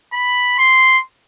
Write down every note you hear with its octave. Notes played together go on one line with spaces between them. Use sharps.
B5
C6